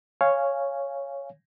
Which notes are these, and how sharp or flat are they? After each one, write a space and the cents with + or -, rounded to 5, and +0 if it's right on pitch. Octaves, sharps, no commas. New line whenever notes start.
C#5 +0 F5 -10 G#5 -5